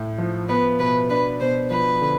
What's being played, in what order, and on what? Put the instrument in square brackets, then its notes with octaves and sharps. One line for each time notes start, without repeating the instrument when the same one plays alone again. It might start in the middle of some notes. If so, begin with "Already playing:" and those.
Already playing: [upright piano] A2
F3
[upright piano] B3 [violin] B4
[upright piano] B2 [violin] B4
[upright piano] D4 [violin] B4
[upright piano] B2 [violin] C5
[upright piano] F3 [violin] B4
[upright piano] D3